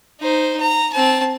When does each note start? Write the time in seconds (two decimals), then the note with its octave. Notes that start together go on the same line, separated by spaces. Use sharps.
0.20 D#4 C5
0.61 A#5
0.93 C4 A5